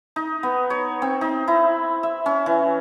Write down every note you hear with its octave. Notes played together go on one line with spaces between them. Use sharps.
D#4
B3
C#5
C4
D#4
E4
E5
C#4
E3